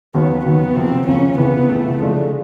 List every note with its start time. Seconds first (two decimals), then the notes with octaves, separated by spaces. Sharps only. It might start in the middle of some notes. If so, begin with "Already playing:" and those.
0.14 D#2 D#3 F#3 B3
0.45 D#2 D#3 F#3 B3
0.76 C#2 C3 F3 A#3 C4
1.07 C#2 C3 F3 A#3 C#4
1.38 C#2 C3 E3 B3
1.69 C#2 C3 E3 A3
1.99 C#3 F3 G#3 A3 D4 F4